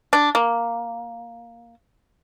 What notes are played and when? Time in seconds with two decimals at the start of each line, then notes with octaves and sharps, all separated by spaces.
0.13 D4
0.35 A#3